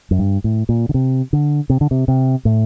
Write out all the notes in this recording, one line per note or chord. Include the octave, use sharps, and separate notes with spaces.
F#2
G2
A2
A#2
D3
C3
D3
C3
D3
C3
C3
A2